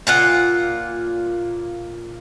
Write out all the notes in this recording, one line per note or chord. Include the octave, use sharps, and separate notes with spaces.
A#2 F4 F#5